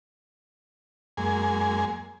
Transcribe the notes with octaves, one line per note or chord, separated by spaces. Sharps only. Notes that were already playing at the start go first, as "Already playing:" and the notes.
F#2 G#3 A#3 G#5